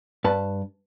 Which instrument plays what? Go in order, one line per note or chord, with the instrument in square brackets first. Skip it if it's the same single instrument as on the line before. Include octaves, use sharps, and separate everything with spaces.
[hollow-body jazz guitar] G2 B4 A5